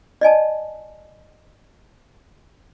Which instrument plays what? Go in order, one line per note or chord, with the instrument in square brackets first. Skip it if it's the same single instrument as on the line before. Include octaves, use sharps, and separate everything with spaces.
[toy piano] D5 D#5 G#5 A5